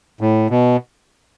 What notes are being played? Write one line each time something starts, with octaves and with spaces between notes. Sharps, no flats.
A2
B2